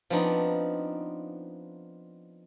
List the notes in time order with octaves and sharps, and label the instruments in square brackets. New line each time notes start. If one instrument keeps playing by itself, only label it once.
[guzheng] F3 B3 C4 D4 D#4